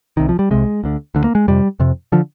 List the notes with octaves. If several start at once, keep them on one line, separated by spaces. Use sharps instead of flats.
C2 C3 D#3
F3
G3
C2 C3 G#3
D2 D3
D2 D3
A#3
G#3
F2 C3 G3
F2 C3
D3 F3